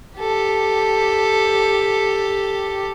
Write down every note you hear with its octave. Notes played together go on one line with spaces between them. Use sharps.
G4 A4